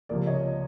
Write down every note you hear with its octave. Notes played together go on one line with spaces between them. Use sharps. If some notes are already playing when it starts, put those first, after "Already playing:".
C#2 C3 F3 A#3 D5
C#5 D#5